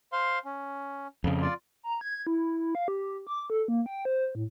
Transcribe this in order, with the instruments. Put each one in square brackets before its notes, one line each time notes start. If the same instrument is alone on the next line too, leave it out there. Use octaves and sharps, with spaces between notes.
[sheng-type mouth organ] C5 F5 C6
C#4
[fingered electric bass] F2 C#3
[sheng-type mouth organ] F4 D5
[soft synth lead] A#5
G#6
E4
F5
G4
D6
A4
A#3
G5
C5
A2